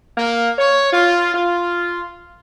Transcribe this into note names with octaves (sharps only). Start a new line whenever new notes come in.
A#3
C#5
F4
F4